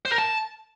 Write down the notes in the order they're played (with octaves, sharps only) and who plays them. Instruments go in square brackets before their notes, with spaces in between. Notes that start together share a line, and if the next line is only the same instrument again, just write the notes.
[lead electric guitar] C5
A#4
A5